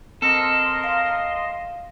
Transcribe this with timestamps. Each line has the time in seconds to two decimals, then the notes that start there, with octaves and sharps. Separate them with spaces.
0.22 C4 A4 A#4 D#5 C6
0.84 F5